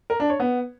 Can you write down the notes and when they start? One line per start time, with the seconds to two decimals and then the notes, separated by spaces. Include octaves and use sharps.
0.10 A#4
0.20 D4
0.30 C#5
0.40 B3